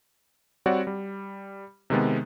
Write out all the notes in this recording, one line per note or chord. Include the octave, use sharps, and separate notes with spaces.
G3 C4 F#4 C#5 D5 F#5
G3
C3 D#3 G#3 B3